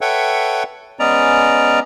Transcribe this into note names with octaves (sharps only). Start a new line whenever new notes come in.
A4 B4 C#5 E5 F#5 G5
G#3 B3 C#4 D5 A#5